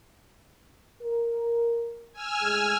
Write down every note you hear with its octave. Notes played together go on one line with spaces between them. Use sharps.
A#4
G#5 E6 F6
A2 G#3 G#4